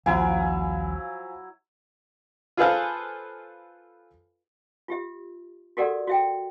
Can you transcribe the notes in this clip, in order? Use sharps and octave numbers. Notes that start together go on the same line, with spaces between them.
D#1 A#1 F3 F#3 E4 F5 G#5 B5
F4 G#4 A4 B4 C5 F5
F4 G4 E5
F#4 G4 A4 A#4 D5 F#5
F#4 E5 G5